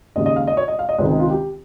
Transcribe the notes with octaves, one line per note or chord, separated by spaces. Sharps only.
D#2 C#3 G#3 D#5
D#5
F5
D#5
C#5
D#5
F5
D#5
C#2 C3 D#3 G#3 C5
G#4
F4
G4